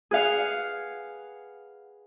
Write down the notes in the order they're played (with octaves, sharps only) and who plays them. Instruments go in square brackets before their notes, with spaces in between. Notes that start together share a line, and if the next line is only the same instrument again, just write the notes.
[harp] G#4 B4 F5 F#5